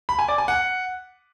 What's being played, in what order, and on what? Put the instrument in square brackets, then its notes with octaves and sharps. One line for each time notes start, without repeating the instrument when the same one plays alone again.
[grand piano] B5
G#5
D5
G#5
F#5